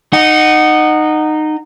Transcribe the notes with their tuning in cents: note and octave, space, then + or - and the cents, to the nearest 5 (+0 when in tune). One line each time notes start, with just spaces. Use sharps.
D#4 -15 F#5 +0